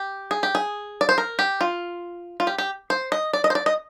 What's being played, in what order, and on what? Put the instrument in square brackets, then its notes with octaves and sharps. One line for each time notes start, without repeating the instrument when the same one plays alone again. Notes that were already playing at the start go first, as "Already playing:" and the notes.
Already playing: [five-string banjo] G4
G#4
G4
G#4
D5
C5
A#4
G4
F4
F4
G4
G4
C5
D#5
D5
D#5
C5
D5
D#5